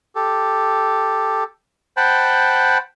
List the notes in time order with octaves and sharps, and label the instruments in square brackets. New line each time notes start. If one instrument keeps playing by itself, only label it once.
[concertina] G4 A4
C5 F#5 G5 A5 B5